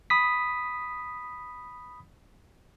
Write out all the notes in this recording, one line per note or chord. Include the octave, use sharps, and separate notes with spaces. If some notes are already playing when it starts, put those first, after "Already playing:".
B5 D#6 B6